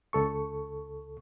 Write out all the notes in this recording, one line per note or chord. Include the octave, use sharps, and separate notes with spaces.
C#2 A4 C#6